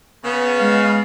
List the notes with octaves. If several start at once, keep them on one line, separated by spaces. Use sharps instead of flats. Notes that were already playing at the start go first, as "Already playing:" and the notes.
C#3 B3
G#3 F5